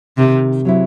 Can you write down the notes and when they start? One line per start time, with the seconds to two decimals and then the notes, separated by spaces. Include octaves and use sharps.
0.18 C3 D#3
0.65 F#3 C4 E4